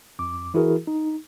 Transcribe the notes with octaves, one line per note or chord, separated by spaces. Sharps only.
F2 D6
E3 E4 F#4 G#4 A#4
D#4